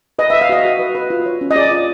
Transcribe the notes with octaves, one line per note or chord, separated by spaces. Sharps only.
B4 D#5
E5
B4
F5
F#4 D#5
F#4
B4
B4
F4
C#5
C#4
D#5
G#4 D5
F4